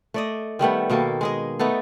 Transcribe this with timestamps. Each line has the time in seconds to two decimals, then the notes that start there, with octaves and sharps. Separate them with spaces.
0.14 A3 D5 D#5
0.59 D#3 G3 A3 B3
0.90 B2 D#3 A#3 A4
1.21 G#3 G#4 D#5
1.59 A3 B3 D#4 A4